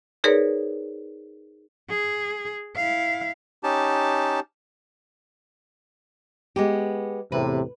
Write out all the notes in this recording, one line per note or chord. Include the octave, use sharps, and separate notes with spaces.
D#4 G#4 A#4 B4 C#5 D5
G#4
E4 F5
C#4 D#4 G4 A5
G#3 B3 G4
E2 A2 C3 B4